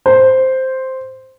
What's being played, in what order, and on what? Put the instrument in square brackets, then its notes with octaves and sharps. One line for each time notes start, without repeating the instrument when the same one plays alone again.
[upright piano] C5